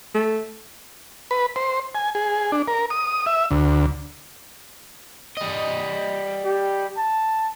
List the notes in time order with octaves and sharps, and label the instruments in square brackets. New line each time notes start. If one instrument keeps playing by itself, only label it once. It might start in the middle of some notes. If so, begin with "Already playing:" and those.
[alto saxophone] A3
[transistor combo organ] B4
C5
G#5
G#4
D4
A#4
D#6
E5
D2
[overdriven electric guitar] G3 D#5
[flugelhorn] G4
A5